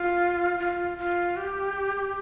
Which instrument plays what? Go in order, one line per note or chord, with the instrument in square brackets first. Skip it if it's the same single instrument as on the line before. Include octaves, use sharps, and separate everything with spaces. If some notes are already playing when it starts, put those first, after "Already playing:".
Already playing: [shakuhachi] F4
F4
F4
G4